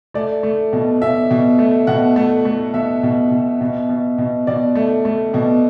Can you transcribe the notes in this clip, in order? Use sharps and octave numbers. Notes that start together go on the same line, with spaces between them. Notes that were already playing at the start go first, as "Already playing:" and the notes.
A3 D5
A3
B2
B2 E5
B2
A3
B2 F#5
A3
A3
B2 E5
B2
B2
B2
B2
B2
B2 D5
A3
A3
B2